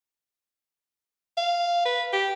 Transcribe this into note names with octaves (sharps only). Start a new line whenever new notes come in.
F5
B4
G4